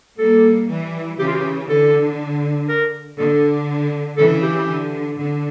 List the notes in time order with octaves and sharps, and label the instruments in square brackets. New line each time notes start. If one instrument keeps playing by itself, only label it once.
[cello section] G3 A#3 [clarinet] A4
[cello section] E3 G3
[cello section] C#3 E3 [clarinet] G4
[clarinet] F4
G4
[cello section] D3 [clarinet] A4
[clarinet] A#4
[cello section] D3 [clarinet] A4
[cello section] C#3 E3 [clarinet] A4
[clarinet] G4
[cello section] D3
D3